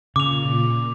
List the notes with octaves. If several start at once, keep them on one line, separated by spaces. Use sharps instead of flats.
A#2 C#3 D6 F7